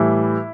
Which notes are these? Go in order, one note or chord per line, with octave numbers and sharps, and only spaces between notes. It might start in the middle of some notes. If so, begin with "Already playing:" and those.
Already playing: A2 E3 G3 E4